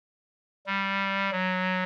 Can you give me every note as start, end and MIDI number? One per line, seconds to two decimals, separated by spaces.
0.66 1.30 55
1.31 1.83 54